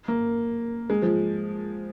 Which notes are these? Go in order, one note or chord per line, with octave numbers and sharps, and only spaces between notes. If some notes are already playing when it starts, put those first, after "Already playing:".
A#3
G#3
F3